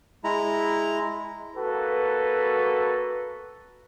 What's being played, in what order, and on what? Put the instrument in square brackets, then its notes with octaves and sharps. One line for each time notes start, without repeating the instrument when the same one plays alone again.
[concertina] G#3 E4 A#5
[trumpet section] A#3 F#4 A4 B4